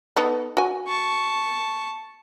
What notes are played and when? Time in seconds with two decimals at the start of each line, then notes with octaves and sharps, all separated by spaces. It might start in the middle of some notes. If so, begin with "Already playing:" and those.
0.16 B3 D#4 A4
0.57 F#4 G#5
0.88 A5 C#6